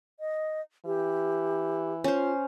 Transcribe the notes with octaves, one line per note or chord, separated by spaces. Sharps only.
D#5
E3 G4
C#4 F4 C5